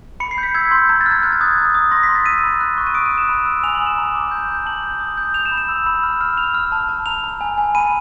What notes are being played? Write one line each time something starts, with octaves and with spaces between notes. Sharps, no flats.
B5 C#7
C7
G6
B6
E6 G#6
C6 G6
A#5 G#6
A6
F6
G#6
F#6 G#6
A6
D#6 G#6
A#5
D#6
C6 A#6
B6
C6
A6
E6 D#7
B5
F#6
C#6
D#7
D#6 D7
D#7
F#6
E7
B5
E6
G#5 F7
F#7
D#6
E7
A#5
D6
G6
G6
A5 F#7
G6
D#6
G6
G6 F7
E7
B5
E7
E6
B5
F6
F6
F6 F7
F6
A5
A5
A#5 F7
A#5
G#5
G#5
B5 D#7